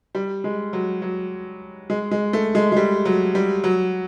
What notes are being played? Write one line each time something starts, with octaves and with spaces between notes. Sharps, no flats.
G3
G#3
F#3
F#3
G#3
G#3
A3
G#3
G#3
G3
F#3
G3
F#3